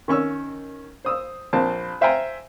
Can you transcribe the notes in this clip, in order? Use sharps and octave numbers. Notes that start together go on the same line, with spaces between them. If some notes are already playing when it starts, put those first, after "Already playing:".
D#3 C#4 C#6 E6
C5 D#6 E6
A#1 C4 A5
C5 E5 F5 G5 G#5 A#5